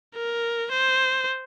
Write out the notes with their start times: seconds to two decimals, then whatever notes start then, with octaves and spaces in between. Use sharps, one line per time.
0.15 A#4
0.72 C5